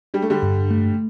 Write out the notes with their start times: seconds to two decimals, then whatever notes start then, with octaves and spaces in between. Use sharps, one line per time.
0.14 G3 D4
0.22 A3
0.30 D3 G3
0.43 G2
0.71 A3